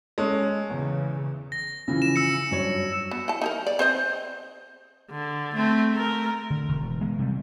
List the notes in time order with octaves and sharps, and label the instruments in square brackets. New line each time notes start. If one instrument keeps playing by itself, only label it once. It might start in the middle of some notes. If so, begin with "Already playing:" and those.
[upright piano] G#3 A4 [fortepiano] C#4
[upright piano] E2 [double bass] C#3 E3
[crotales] A#6
[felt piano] C#3 E3 F3
[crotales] E7
E6 C#7
[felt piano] G2 F#3 C#5
[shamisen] B3
E4 A5
D#4 G#4 A#4
D5
C4 C5 D#5
[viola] D3
A3 C4
A3 A#4
[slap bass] D3
E1
G#3 B3
C3 G3